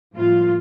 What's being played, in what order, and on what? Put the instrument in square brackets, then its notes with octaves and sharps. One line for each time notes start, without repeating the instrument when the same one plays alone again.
[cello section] A2 F3 G3 A#3 F4